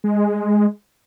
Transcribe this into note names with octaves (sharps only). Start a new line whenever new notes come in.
G#3